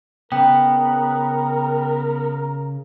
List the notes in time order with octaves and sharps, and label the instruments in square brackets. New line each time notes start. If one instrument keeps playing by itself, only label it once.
[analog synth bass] C#3 [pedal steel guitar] B3 [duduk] A#4 [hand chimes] G5